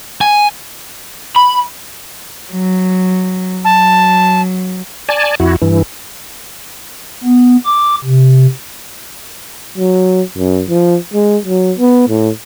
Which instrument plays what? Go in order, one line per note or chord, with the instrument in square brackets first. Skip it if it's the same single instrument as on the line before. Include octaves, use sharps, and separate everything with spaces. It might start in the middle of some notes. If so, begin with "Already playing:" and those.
[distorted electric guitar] G#5
[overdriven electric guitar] B5
[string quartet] F#3
[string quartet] F#3 [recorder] A5
[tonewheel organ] D5 G#5 A5
F2 E4 F#4
G2 E3
[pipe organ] B3
D6
C3
[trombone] F#3
F#2
F3
G#3
F#3
B3
A2